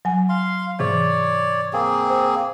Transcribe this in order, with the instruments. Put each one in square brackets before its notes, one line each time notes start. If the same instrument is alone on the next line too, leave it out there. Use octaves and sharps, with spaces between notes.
[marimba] F#3 G#5
[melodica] F5 C6
[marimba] G#2 C3 E3 [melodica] C#5 D5
[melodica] A#3 C4 G#4
[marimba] C5